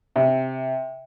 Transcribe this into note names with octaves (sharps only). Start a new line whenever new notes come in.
C3